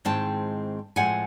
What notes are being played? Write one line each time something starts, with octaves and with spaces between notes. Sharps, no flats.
G#2 D#3 G#3 C4 E4 G5 A5
A2 F3 G#3 C4 F4 F#5 G#5